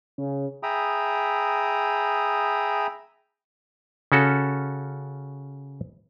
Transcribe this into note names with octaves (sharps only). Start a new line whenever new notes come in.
C#3
G#4 E5 G5 A#5 B5 D#6
C#3 C#4 F#4 A4